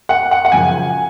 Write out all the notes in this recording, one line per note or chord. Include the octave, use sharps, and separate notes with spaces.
F#5
F#5
F#5
F#2 C#3 F3 G#5